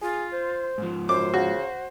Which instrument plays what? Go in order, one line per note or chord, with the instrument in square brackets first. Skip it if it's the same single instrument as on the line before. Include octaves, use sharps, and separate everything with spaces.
[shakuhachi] F4 [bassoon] G#4
[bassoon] C5
[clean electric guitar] G#2 F3
[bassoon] F#2 [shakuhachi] C5 [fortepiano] D6
[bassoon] C#3 [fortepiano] F#4